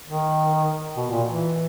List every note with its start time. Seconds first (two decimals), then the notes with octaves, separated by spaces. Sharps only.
0.07 D#3
0.96 B2
1.11 A#2
1.27 E3